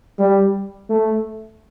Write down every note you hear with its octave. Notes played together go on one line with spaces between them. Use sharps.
G3
A3